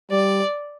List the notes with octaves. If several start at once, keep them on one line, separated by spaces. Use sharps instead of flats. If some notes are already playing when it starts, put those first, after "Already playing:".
G3 D5